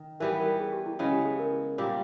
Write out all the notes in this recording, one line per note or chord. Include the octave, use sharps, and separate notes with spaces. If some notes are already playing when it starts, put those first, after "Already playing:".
Already playing: D#3
E3 G3 B3 A#4
A#4
G#4
G4
E4
C#3 G#3 B3 E4
G4
G#4
A#4
A#2 G3 A#3